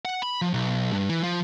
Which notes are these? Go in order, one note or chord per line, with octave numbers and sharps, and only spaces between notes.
F#5
B5
F3
B1
G2
E3
F3